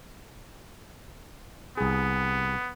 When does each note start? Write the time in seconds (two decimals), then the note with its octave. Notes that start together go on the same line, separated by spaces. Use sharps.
1.77 C2 B3 G#4